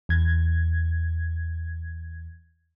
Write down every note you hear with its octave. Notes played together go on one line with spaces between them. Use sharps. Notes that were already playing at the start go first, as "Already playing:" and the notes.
E2 G#6